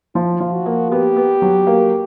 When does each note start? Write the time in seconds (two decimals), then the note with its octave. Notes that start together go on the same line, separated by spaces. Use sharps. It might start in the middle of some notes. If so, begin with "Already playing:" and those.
0.15 F3 F4
0.40 F3
0.53 F#4
0.66 A#3
0.91 B3 G4
1.16 B3
1.42 F#3
1.67 A#3